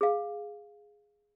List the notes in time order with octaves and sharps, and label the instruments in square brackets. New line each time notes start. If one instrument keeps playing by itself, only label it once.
[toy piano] G#4 F5